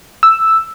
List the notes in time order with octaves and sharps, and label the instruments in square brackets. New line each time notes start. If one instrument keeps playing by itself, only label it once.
[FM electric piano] E6